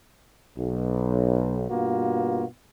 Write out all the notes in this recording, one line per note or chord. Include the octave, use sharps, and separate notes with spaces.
B1
G2 B2 A#3 F4 F#4